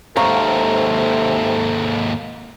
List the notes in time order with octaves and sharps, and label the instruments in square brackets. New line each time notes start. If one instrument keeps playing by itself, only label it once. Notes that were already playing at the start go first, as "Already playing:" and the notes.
[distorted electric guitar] D#2 G#2 [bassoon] C3 [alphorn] A4 [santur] F5 A#5 C#6